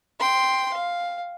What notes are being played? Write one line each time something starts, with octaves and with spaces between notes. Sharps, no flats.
G5 C6
F5